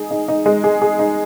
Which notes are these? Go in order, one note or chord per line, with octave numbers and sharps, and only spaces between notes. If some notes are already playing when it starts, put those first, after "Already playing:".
Already playing: D#4 G#4
D#4
D#4
G#3
G#4
G#4
D#4